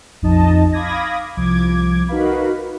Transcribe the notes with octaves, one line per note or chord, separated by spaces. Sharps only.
A#1 F2 D#4 D#5 A5
F5 B5 D6 D#6 G#6 A#6
C2 F3 D6 G#6
D#4 F#4 A#4 B4 F5 B5